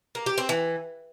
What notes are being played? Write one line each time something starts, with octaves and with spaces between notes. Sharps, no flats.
A#3
G4
C4
E3